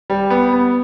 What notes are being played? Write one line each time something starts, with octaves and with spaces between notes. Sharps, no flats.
G3
B3
B3